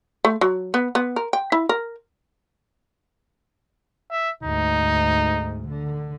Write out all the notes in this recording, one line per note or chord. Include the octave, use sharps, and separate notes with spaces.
A3
F#3
B3
B3
A#4
G5
E4
A#4
E5
D2 G#2 D#4
D3